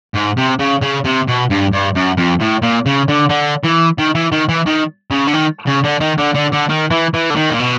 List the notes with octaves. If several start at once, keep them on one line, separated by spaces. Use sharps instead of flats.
G#2
C3
C#3
C#3
C3
B2
G2
G2
F#2
F2
A2
A#2
C#3
D3
D3
E3
D#3
E3
D#3
E3
D#3
C#3
D3
D#3
C#3
D3
D#3
D3
D3
D3
D#3
E3
E3
D3
D#3
A#2
B2